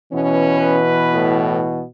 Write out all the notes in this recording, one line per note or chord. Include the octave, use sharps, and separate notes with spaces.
B2 E3 B3 C#4
B4
A2